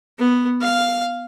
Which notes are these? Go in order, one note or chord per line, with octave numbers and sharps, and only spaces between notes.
B3
F5